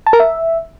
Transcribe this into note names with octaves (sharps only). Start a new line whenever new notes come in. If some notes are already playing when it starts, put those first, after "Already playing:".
A5
A#4
E5